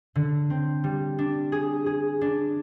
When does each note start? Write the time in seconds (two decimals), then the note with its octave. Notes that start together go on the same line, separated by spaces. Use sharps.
0.15 D3
0.50 C4
0.84 G3
1.19 D4
1.52 G#4
1.86 G#4
2.21 D4